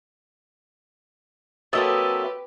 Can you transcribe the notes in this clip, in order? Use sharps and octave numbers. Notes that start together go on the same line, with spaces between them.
F#3 A#3 C4 G4 A4 B4 D#5 E5